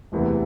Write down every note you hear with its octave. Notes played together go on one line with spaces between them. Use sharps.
E1 D2 C3 E3 B3